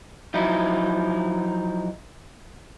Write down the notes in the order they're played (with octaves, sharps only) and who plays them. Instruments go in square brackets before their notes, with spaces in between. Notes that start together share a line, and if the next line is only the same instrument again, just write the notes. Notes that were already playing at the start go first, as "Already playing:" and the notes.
[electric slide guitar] F3 F#3 D#4 E4